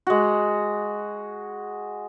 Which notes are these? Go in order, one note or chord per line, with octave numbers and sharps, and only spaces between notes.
G#3 F#4